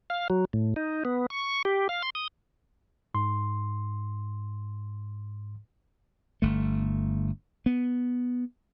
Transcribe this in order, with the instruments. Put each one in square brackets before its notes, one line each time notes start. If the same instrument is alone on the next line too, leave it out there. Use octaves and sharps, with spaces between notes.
[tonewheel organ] F5
F#3
A2
D#4
B3
C#6
G4
F5
C6
D#6
[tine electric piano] G#2 C6
[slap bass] G1 A3
B3